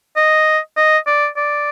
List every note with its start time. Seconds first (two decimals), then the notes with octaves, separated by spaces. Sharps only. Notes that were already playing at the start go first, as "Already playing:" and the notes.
0.17 D#5
0.77 D#5
1.07 D5
1.37 D5